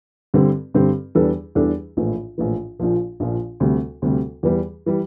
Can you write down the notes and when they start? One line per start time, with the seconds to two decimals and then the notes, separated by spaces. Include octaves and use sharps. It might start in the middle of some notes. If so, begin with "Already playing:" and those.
0.34 G2 D3 G3 C4
0.74 G2 D3 G3 C4
1.15 E2 E3 G3 D4 A4
1.55 E2 E3 G3 D4 A4
1.97 A#1 A2 E3
2.38 A#1 A2 E3
2.80 A#1 A#2 F3
3.20 A#1 A#2 F3
3.60 D2 C3 G3
4.02 D2 C3 G3
4.43 E2 E3 G3
4.86 E3 G3